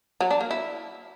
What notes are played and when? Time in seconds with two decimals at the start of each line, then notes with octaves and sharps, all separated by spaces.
0.21 F#3
0.31 D4
0.41 A#3
0.51 E4